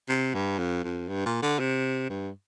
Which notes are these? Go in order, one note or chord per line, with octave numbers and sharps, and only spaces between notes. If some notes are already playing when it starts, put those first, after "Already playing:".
C3
G2
F2
F2
G2
A#2
D3
C3
G2